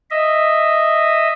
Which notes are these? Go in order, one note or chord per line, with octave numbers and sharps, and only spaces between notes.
D#5 E5